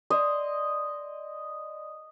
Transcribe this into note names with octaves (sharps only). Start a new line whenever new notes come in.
D5 D#5 C6